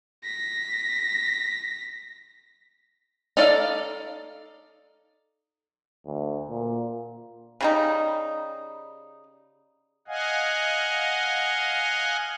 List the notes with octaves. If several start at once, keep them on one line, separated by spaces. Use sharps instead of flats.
A#6 B6
D#4 A4 D5 E5 F5
D2
A#2
C#3 G3 D#4
D#5 F5 F#5 G#5